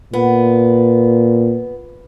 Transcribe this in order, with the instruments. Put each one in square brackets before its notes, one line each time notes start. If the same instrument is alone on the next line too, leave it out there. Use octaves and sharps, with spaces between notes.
[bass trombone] A#2 [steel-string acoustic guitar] B3